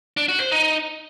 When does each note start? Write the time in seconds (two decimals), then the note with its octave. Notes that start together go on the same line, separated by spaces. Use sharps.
0.17 D4
0.28 F#4
0.40 C5
0.52 D#4